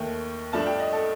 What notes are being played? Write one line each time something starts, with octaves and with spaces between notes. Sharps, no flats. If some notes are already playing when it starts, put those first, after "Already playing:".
Already playing: D#2 D#3 A3 G5
G2 F3 A3 D4 A5
G5
D#5
A4